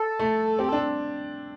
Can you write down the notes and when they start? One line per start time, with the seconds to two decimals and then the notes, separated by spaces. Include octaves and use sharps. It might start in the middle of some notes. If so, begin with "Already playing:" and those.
Already playing: A4
0.19 A3
0.59 C4 G4
0.69 D4 A4